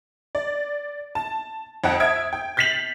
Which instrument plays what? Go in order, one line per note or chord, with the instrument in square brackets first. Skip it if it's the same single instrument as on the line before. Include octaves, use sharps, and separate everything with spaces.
[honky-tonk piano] D5
A5
F2 D#5 F#5 G5 A5
E5 D#6 G#6 D7
G5
G6 A6 B6 C7 F7 F#7